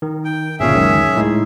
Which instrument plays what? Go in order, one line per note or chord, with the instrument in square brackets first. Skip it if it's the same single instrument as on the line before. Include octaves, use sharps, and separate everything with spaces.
[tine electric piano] D#3
[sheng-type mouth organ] G5
[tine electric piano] G1 A#2 C#3 [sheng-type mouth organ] C#4 G#4 E5
[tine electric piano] C#2 F#2 D#3
A2 G#3 D#4